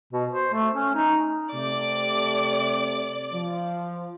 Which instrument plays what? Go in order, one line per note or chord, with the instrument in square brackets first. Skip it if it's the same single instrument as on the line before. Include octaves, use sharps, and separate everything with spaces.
[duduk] B2
C5
A3
C#4
D#4
[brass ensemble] C3 A3 [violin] D5 D6
[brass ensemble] F3